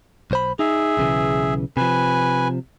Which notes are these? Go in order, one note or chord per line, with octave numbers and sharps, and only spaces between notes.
B1 C5 B5
D#4 G#4 E5
B1 C#3 E3
C3 F3 B4 G#5